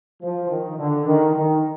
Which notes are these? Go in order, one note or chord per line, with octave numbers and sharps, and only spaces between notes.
F3
D#3
D3
D#3
D#3